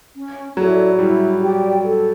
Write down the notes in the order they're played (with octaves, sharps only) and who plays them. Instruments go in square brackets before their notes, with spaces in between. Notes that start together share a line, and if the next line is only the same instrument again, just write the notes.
[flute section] C#4
[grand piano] F#3 [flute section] E4 A4 D5
[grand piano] G3 [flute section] E4
[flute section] G4 D5 G5
A4